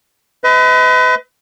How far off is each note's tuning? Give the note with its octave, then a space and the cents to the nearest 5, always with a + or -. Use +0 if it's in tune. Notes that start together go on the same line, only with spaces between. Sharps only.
B4 +35 D#5 +40